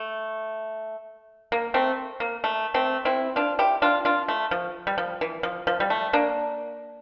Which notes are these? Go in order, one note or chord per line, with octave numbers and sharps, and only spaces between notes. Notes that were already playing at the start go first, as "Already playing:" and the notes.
Already playing: A3
A#3
A3 C4
A#3
A3
A3 C4
C4 E4
D4 F4
E4 G4
D4 F4
D4 F4
A3
F3
G3
F3
E3
F3
F3
G3
A3
A#3 D4